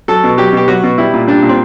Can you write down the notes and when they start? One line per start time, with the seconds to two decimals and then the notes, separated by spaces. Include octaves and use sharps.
0.08 F#3 A4
0.24 B2
0.38 F#3 G4
0.53 B2 G4
0.68 F#3 F#4
0.83 B2
0.98 G3 E4
1.14 A#2
1.28 G3 D4
1.43 A#2
1.49 C4